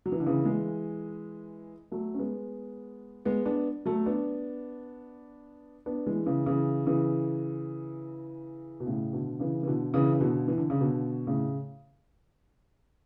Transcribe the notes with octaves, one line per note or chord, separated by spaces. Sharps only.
F#3
E3
D3
C#3 E3
E3 G#3
F#3 A3
C#4
G#3 B3
G#3 B3
B3 D4
F#3 A3
B3 D4
B3 D4
E3 G#3
C#3 E3
C#3 E3
C#3 E3
B2
A2 C#3
B2 D3
C#3 E3
E3
B2 D3
C#3 E3
C#3
B2 D3
E3
D3
C#3
B2 D3
A2 C#3